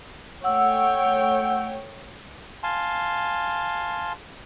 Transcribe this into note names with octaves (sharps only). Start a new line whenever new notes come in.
A3 C#5 F#5 G5 E6
F5 G#5 A5 C6